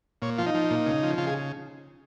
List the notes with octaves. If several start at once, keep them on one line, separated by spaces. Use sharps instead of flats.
A#2 C#5
F3 F4
D#4
F3
A#2
C#3
F3
C#3 F4
G#4